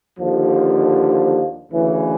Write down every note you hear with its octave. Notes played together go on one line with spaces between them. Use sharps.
D#2 D3 F3
D2 C#3 E3